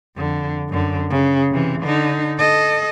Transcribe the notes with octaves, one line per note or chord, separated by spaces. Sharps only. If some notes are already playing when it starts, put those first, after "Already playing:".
F2 D3
F#2 D3
C#3
C3 E3
D3 D#4
A4 D#5